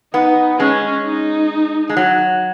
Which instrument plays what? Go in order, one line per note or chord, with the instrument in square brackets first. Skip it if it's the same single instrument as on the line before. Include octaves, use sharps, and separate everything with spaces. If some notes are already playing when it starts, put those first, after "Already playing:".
[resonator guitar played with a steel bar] B3 [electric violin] D#4
[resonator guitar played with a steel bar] G#3 [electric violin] C#4
[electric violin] D#4
[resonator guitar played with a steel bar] G#3
F#3